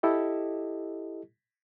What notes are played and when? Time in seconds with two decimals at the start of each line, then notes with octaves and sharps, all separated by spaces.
0.03 E4 G4 A4 D#5